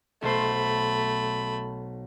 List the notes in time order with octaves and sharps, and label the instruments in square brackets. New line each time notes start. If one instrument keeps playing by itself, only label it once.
[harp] B1 C5 [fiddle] A3 B5